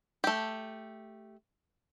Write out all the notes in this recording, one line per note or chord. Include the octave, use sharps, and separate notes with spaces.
A3 G4